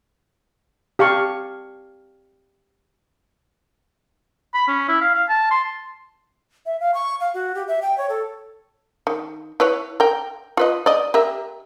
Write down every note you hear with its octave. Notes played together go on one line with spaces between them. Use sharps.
G4 F5 A5 C#6
B5
C#4
E4
F5
F5
A5
C6
E5
F5
C#6
F5
F#4
G4
E5
G5
C#5
A4
D#3
E4 B4 C#5
A#4 G5
F4 B4 D#5
D5 D#5
G4 A#4 E5